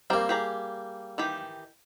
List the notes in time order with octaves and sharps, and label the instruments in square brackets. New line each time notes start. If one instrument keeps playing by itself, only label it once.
[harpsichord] G3 A#3 [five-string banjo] C4 G5 A#5
[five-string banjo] G4 G#4 A#5
D#3 E3 G4